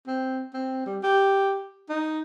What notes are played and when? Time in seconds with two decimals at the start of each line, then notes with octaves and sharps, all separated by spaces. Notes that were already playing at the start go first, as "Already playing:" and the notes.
0.07 C4
0.54 C4
0.86 G3
1.03 G4
1.89 D#4